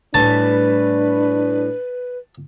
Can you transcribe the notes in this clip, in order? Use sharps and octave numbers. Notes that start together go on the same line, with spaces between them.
A2 E3 G3 D4 B4 A5